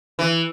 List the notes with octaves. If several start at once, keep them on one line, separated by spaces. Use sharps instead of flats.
E3